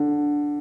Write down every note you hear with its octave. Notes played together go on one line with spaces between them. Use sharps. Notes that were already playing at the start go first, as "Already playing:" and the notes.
Already playing: D3